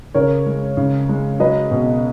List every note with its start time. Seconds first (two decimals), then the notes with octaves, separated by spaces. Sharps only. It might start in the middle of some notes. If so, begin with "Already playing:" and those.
0.14 C#3 A#4 C#5
0.46 G#3
0.77 C#3
1.09 G#3
1.40 F#3 B4 D#5
1.71 B2